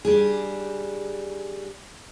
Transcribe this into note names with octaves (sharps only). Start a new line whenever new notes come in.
G3 D4 G#4